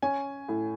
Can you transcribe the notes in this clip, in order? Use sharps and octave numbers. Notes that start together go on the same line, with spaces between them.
C#4 G#5
A2